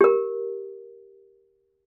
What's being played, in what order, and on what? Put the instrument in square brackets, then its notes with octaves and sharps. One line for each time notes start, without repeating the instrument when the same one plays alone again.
[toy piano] G4 A#4